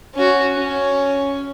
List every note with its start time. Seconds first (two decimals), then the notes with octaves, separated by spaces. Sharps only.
0.15 C#4 F#4
0.55 C#4